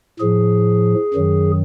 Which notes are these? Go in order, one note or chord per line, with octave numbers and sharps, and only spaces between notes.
A2 F3 G#4
F#2 D#3 F#3